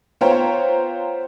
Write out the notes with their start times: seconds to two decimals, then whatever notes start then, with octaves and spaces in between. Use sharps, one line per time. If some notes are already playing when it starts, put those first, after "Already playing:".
0.21 B3 F4 C5 C#5 G5 A#5